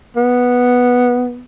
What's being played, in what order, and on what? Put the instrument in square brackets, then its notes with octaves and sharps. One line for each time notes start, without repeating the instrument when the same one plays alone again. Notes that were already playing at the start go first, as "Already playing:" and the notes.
[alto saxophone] B3